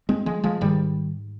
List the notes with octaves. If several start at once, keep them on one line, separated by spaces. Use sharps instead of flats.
G#3 C4
F3 G#3
F3 G#3
G#2 D#3 G3